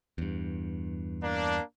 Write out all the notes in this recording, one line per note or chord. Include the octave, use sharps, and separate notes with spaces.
E2 G2
A#3 D4